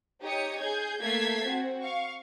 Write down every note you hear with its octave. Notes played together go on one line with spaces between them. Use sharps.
D#4 G4 C#5 D#6 C#7
G#4 G6 G#6
A3 A#3 A5 G#6 B6 C7
C4 F#4
F5 C#6